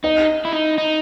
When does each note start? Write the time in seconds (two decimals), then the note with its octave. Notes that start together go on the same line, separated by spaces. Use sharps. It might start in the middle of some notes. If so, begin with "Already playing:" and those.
0.04 D#4 D#5
0.45 E4
0.53 D#4
0.78 D#4